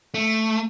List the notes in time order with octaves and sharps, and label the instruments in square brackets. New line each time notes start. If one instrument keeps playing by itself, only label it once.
[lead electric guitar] A3